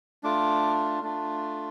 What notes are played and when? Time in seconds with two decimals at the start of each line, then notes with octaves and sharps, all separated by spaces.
0.23 A3 D4 F4 D6
1.03 A3 D4 F4